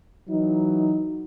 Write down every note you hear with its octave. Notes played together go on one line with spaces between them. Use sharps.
E3 F#3 D#4